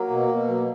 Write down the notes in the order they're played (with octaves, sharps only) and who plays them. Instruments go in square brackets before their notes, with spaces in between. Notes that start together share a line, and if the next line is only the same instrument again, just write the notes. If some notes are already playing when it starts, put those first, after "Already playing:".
Already playing: [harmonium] F#3 A#3
B2
B2
F#3